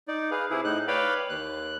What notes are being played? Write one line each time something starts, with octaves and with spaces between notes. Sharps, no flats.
D#4 D5
G#4 B4 F5
C3 E4 G#4
A2 D#4 F#6
B4 C#5 D5 F5 G5 B5
D#2 F#6